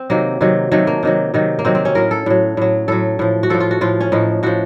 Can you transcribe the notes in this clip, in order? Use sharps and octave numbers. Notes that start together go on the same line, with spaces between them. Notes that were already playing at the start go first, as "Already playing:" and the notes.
Already playing: C4
C3 D#3 F#3 A#3
C3 D#3 F#3
C3 D#3 F#3 A3
A#3
C3 D#3 F#3
C3 D#3 F#3
A#3
C3 D#3 F#3 C4
C4
C#4
A2 F#3 A#4
A4
A2 F#3
A2 F#3
A2 F#3 A4
A2 F3
F#4
A2 F3 A4
F4
F#4
A2 F3 F4
C#4
A2 F3 D#4
A2 F3 F#4